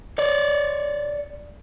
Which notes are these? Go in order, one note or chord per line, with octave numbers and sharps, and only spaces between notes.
C#5 D5